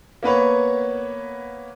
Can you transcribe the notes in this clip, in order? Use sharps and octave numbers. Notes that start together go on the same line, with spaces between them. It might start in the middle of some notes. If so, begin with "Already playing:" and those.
A#3 B3 B4 C#5